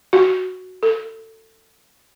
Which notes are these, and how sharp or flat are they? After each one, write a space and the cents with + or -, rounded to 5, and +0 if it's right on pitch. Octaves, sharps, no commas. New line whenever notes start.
F#4 -5
A4 +25